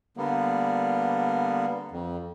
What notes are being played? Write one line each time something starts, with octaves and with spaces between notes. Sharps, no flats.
D3 G3 A#3 B3
F2